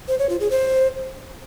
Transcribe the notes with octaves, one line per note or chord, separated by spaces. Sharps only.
C5
C#5
F4
G#4
C5